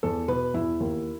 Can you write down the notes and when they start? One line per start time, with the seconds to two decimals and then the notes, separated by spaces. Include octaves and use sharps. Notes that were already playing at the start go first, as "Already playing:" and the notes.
0.03 E2 A4
0.28 B2 B4
0.54 E2 E4
0.80 D#2